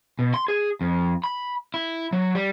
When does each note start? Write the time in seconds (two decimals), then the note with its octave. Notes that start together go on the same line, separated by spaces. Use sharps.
0.19 B2
0.34 C6
0.48 G#4
0.81 F2
1.24 B5
1.74 E4
2.13 F#3
2.35 G3